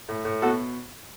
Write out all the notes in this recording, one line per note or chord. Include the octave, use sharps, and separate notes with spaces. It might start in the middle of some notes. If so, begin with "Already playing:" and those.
A2
A2
B2 F#4 A4